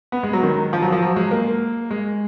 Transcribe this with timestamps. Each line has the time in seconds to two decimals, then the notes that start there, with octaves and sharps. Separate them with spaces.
0.12 B3
0.23 G#3
0.33 F#3
0.43 D#3
0.73 F3
0.82 F#3
0.92 F3
1.02 F#3
1.16 G#3
1.31 A#3
1.91 G#3